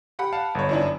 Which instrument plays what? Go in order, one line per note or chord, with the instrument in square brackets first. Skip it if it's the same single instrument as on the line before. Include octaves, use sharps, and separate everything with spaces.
[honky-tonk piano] G4 F#5 B5
[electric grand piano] F5 A5
G1 C#5
[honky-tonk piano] F#2 D4 E4